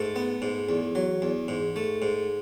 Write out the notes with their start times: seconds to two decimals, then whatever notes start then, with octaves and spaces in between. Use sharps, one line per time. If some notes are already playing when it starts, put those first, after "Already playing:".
Already playing: G#2 A3 A4
0.16 B3
0.42 G#2
0.69 E2
0.95 F#3
1.22 E2
1.48 G#2
1.76 A3
2.02 G#2